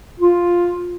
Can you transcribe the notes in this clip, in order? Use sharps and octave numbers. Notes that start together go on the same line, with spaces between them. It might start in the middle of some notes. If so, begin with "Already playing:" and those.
F4